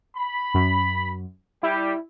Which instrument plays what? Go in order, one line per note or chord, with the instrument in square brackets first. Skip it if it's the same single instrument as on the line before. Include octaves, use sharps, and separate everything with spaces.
[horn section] B5
[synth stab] F#2
[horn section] G3 G4 [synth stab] E4